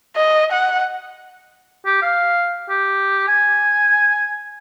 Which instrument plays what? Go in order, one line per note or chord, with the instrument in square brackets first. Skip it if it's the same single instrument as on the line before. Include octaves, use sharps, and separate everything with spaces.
[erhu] D#5
F#5
[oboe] G4
F5
G4
G#5